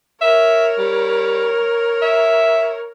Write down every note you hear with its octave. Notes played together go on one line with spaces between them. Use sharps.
A#4 C#5 E5
G3
E5